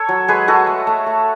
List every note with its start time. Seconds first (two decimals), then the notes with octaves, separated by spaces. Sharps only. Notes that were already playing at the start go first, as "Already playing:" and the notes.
Already playing: A4 C#5
0.09 F#3
0.28 G#3 G#4 B4
0.48 G#3 F#4 A4
0.67 A3
0.87 A3
1.06 A3